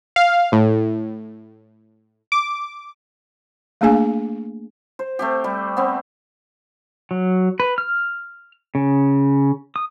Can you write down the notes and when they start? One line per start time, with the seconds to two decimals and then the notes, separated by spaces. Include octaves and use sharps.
0.16 F5
0.52 A2
2.32 D6
3.81 A3 A#3 D4 G#4 F5 G#5
4.99 C5
5.19 A3 C4 G4
5.44 G3
5.77 B3 C4
7.11 F#3
7.60 B4
7.78 F6
8.75 C#3
9.76 D#6